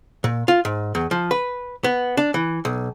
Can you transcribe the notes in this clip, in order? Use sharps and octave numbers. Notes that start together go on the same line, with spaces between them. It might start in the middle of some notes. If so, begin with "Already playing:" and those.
A#2
F4
G#2
E2
F3
B4
B3
D4
E3
B1